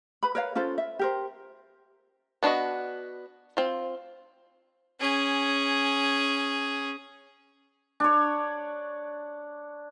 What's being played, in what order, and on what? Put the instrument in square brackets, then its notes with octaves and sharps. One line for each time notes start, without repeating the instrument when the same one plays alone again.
[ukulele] B4 B5
A#4 B4 C#5 F5
C#4 F4 A4 C5
E5
G4 A#4 C5
[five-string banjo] B3 D4 F4 F#4 D#5
C4 F4
[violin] C#4 G#4
[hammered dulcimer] D4 C#5